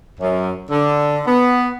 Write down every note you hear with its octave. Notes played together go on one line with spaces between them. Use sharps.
F#2
D3
B3